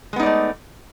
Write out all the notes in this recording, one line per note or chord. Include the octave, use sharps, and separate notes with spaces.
G#3 A3 B3 D#4 D5